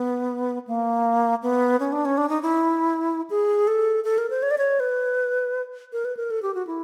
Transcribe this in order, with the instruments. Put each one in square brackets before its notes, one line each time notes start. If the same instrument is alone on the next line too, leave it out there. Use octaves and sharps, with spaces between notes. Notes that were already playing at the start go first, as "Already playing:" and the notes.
Already playing: [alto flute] B3
A#3
B3
C#4
D4
C#4
D4
D#4
E4
G#4
A4
A4
A#4
C5
C#5
D5
C#5
B4
A#4
B4
A#4
A4
G4
F#4
E4